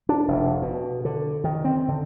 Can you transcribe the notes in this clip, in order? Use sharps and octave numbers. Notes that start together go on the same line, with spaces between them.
D4
F1
B2
D3
D#3
C4
D3